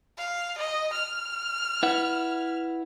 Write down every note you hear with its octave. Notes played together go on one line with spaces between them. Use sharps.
F5
D#5
F6
E4 B4 F#5